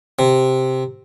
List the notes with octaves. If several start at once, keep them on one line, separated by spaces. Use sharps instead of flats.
C3